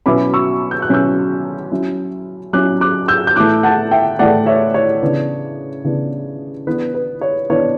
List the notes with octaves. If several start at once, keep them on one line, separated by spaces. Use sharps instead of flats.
B2 F#3 C#4 E4 B5 D6
C#6 E6
G6
F#6
B2 F#3 C#4 E4 E6 G6
F#3 C#4 E4
F#3 C#4 E4 D6 F#6
D6 F#6
E6 G6
G6
A2 E3 A3 D6 F#6
F#5 A5
E5 G5
A2 E3 A3 D5 F#5
C#5 E5
C#5
C#3 E3 B3 D4
C#3 E3 B3 D4
E3 B3 D4 B4
B4
C#5
E3 B3 D4 C#5